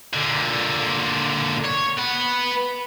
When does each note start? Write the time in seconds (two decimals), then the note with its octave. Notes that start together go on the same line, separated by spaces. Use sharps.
0.14 A#2 D3
1.65 C#5
1.99 B4 F#5